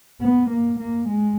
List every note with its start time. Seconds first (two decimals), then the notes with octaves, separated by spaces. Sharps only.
0.21 B3
0.50 A#3
0.80 A#3
1.09 G#3